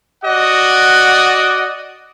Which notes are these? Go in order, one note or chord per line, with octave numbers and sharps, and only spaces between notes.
F#4 D5 D#5 F#5